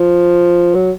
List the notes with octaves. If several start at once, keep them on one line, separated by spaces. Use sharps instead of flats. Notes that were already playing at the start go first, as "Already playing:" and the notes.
Already playing: F3
F#3